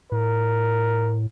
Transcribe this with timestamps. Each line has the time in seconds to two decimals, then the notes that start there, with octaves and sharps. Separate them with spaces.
0.12 A2 A#4